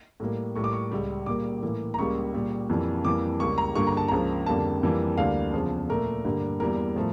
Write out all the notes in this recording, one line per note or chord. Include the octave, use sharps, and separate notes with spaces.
A2 G3 A#3
A2 G3 A#3 C#6
D6
C#6
C#2 C#3 G3
A#2 G3 A#3 D6
A2 E3 A#3
A#5
C#2 C#3 G3 A#3 C#6
A#2 G3 A#3
F2 E3 G3 A#3
F2 E3 G3 A#3 D6
C#2 C#3 G3 A#3 C#6
A#5
G2 D3 G3 A#3 C#6
A#5
A5
C#2 C#3 F3 A#3 A#5
F2 D3 G3 A#3 A5
F2 E3 G3 A#3
D2 D3 G3 A#3 F5
E2 C#3 F3
A#2 A3 A#4
G2 D3 G3 A#3
E2 E3 G3 A#3 A#4
A2 F3 A3